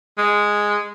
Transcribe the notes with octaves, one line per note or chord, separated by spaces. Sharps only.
G#3